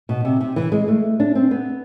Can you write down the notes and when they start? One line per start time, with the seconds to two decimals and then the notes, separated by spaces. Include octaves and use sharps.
0.09 B2
0.25 C3
0.40 C3
0.56 E3
0.72 G#3
0.88 A3
1.20 D4
1.35 C4
1.51 B3